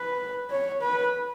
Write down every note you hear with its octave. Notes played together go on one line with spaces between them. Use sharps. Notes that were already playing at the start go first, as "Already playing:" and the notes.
Already playing: B4
C#5
B4